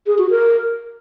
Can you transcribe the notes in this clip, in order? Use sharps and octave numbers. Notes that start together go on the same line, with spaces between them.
G#4
F#4
A#4